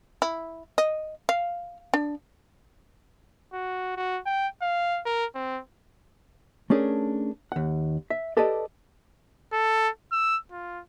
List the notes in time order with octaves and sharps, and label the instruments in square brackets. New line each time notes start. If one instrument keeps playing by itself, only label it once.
[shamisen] E4
D#5
F5
D4
[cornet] F#4
F#4
G5
F5
A#4
C4
[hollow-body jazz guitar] A3 C#4 D4 G#4 A#4
D#2 F#5
E5
G4 A4 B4 D5 D#5 A5
[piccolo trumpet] A4
E6
F4